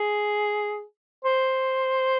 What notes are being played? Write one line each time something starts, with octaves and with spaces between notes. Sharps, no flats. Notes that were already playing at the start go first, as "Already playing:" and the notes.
Already playing: G#4
C5